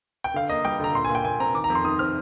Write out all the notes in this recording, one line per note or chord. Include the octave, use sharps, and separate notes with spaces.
G5
D3 F5
A#3 D#5
G3 G5
D3 A#5
A#2 C6
G#5
A#2
G5
A#2 G#5
C4 A#5
D#3 D6
A#5
F2
C6
D#3 D#6
C4 F6